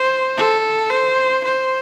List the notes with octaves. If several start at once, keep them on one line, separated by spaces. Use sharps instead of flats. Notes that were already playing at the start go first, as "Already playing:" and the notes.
Already playing: C5
A4
C5
C5